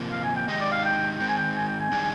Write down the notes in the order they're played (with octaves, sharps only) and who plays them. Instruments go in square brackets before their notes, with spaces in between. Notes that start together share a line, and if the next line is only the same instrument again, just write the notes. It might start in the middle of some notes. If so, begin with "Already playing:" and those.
Already playing: [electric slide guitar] C3 F3 A#3
[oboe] F5
G#5
G5
[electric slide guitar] D#3 G#3 D#4 G4 [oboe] D#5
[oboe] D5
F5
G5
[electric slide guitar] D#3 G#3 C4 [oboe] G5
[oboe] G#5
G5
G#5
G5
G#5
[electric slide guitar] D#3 G3 D4 G#4